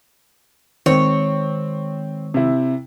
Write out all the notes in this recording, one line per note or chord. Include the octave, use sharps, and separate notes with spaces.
D#3 G#3 C4 C#5
C3 E4